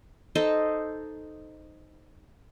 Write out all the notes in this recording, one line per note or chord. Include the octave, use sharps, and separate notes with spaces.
D#4 A4 C5 D#5